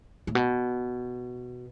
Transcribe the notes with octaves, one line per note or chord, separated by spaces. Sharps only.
A2
B2